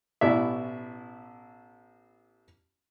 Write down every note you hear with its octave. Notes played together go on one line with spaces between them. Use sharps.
A1 B2 E4 D5 E5